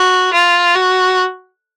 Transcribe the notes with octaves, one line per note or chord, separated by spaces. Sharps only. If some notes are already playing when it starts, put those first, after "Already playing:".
Already playing: F#4
F4
F#4